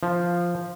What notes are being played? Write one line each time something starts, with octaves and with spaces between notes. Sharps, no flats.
F3